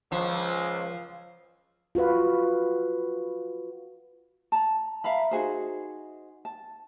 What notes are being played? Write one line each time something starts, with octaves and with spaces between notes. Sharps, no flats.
C#2 F3 C5 C#5 F#5
F4 F#4 B4 F5
A5 A#5
E5 F5 A#5 B5
D#4 F#4 G#4 C5
A5